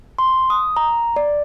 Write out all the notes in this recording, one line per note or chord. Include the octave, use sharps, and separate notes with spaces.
C6
D#6
A#5
D5